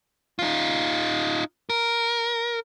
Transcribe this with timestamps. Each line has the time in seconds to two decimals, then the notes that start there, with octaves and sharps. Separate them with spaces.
0.39 D#4 F4
1.70 A#4